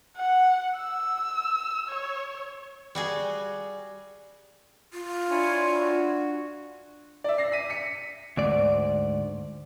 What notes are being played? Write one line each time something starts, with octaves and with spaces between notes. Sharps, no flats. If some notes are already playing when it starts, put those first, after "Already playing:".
F#5
E6
C#5
G3 F#4 G#4
F4
D4 E4 C#5 G#5
F#4
D5 E5
A#6 C7
B6 D#7
B6 C#7
D2 G#2 D5